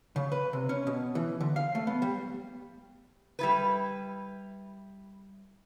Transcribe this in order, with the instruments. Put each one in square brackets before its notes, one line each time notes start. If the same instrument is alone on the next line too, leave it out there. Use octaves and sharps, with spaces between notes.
[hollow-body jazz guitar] C#3
B4
C3
C#4
B2
E3
D3
F5
A3
B3
G3
[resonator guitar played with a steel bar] G3 E4 B4